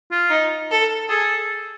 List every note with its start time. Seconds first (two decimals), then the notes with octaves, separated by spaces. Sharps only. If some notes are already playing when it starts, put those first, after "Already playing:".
0.11 F4
0.30 D#4
0.71 A4
1.09 G#4 A4